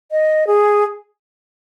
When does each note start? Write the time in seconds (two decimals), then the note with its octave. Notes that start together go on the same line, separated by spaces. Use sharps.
0.11 D#5
0.47 G#4